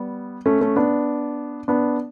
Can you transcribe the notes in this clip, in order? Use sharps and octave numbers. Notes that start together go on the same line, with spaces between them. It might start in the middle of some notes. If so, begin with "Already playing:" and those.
Already playing: G3 B3
A3 C#4
A3 C#4
B3 D4
B3 D4